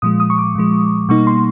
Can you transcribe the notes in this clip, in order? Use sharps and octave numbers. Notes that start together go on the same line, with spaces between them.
A#2 F3 G#3 D#6
D#6
C#6
D6
A#2 F3 G#3
B2 G3 A#3 D#4 C#6
C6